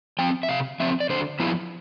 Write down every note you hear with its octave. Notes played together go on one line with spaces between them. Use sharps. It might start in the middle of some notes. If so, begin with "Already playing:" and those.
F3 C4 G5
E5
C3 F5
F3 C4 E5
D5
D3 C5
F3 B3 E4 F4